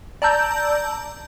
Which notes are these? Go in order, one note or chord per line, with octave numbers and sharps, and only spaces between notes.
D5 A5 A#5 E6 G6